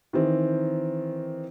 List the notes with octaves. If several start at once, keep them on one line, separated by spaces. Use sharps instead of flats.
D#3 E3 C4